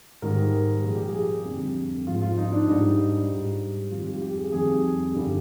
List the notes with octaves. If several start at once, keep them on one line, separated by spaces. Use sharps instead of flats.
G#2 D#3 G3 A#4
A#2 F3 G#4
G4
G#4
F2 D3 G3
G#2 F3 F4
F4
D#4
D4
G#2 G3 D#4
G#2 G3
F2 D#3 G3 F4
G4
G4
G#4
F2 D#3 G3 G#4
G2 D3 G3